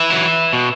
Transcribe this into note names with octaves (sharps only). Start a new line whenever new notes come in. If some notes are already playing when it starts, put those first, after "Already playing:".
Already playing: B4 E5
F#3 E4
B2